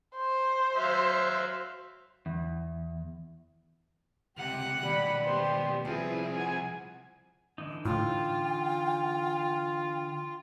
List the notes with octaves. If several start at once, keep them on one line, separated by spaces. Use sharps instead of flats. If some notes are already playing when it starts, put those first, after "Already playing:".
C5
F#3 E5 F5
E2
C#2 C3 G4 F#5
D#2 B2 G3 B5
B3 G4 C5
C2 F3 C4 E4 G#4 B4
F#5 G#5
D3 E3 D#4
A2 F4 G5